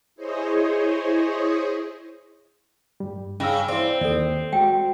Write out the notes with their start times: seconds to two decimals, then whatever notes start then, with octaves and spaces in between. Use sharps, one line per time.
0.16 E4 G#4 C5 C#5 D#5
3.00 G2 G3
3.40 C#3 C#4 E6
3.68 C4 E4 D5
4.01 D#2 A4 D5
4.53 G#3 F#4 G5